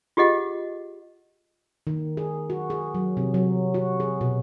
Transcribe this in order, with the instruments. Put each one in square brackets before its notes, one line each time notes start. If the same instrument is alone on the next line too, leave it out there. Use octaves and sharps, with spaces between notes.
[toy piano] F4 G4 G#4 D#5 F#5
[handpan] D#3
G#4
F#4
G#4
F#3
C3
F#3
F#4
G#4
B2